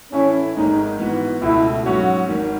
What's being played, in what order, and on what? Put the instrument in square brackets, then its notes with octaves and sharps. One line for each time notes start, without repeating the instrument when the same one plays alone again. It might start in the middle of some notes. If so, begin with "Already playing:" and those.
[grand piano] A2 E3 A3 E4 [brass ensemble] C#4
[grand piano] G#1 G#2 D#3 G#3 [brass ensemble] D#4
[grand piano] G#2 E3 B3 F#4
[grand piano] C#2 B2 A3 [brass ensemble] E4
[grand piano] G#2 F#3 C#4 [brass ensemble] F#4
[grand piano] G#1 G#2 D#3